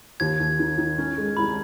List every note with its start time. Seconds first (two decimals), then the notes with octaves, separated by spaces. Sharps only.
0.20 D#2 G#6
0.40 D#2
0.59 D#3
0.78 D#3
0.98 C#4
1.18 G#3
1.37 C2 B5